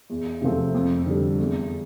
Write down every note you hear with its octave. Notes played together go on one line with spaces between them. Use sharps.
E2
C3 F3 A3 C4
F2
D3 G3
E2